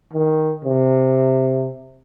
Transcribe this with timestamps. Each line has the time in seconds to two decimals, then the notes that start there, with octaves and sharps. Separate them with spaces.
0.14 D#3
0.65 C3